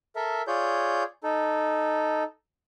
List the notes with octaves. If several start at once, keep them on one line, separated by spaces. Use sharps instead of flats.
A4 A#4 E5
F4 G#4 C#5 D5 G6
D#4 A4